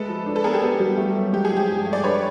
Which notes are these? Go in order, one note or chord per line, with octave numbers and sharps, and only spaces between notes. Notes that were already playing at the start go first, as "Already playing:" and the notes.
Already playing: G#3 A3 A4 B4
F3
D4
A4 B4
B3 G#4 A#4
G4
B3
G3
A3
F#3
G#3 G4
G#4
F3
G4
G2
A3
D5
D4 B4 C#5